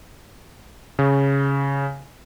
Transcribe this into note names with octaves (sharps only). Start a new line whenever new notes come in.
C#3